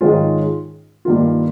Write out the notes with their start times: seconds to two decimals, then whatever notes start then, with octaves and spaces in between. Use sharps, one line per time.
0.01 G#2 D#3 G#3 C#4 F4
1.05 G2 D#3 A#3 F4